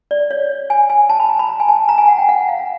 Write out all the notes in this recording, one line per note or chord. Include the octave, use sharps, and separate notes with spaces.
D5
C#5
G#5
G#5
A5
B5
A5
A#5
B5
A#5
G#5
A5
A#5
G#5
F#5
G5
F#5
F5